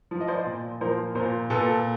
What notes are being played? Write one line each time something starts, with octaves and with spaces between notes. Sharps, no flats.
F3
D#5
C5 D5
A#2
F3 A#4 C5
A#2 A#4 C5
A#2 A4 B4